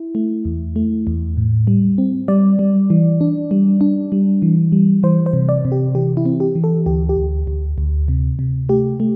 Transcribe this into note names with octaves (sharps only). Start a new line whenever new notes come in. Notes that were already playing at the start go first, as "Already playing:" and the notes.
Already playing: E4
A3
E2
A3
E2
A2
G3
C4
G3 D5
G3
E3
D4
G3
D4
G3
E3
G3
E3 C5
C5
C3
D5
C3
G4
E3 G4
E4
C4
G4
E3
A4
D2 G4
G4
D2
D2
D2
C3
C3
A3 G4
A3